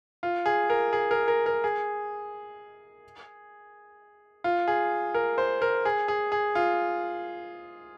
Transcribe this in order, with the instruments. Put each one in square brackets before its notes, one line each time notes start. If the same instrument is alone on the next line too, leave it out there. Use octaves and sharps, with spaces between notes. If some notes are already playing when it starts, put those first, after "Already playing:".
[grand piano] F4
G#4
A#4
G#4
A#4
A#4
A#4
G#4
F4
G#4
A#4
C5
A#4
G#4
G#4
G#4
F4